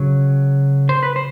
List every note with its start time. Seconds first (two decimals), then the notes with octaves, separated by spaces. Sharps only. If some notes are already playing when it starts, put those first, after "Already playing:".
Already playing: C#3 F#3 C#5
0.89 C5
1.03 B4
1.16 C5